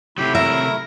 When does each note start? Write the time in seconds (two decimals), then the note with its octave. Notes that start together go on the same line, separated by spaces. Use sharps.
0.18 C3 F#3 A3 E4 G4
0.35 A#4 E5